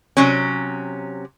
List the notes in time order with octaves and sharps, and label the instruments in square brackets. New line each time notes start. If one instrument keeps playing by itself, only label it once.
[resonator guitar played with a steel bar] C3 F#3 C#4